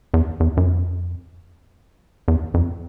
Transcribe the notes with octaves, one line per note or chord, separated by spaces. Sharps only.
E2
E2
F#2
F2
E2
F2